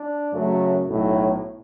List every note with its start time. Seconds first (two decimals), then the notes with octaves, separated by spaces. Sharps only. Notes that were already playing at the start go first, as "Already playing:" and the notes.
Already playing: D4
0.32 F#2 C#3 F#3 A3
0.87 B1 A2 F#3